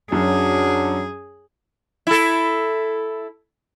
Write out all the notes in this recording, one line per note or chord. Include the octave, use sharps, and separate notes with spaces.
F#2 F#3 D4 G#4
E4 A4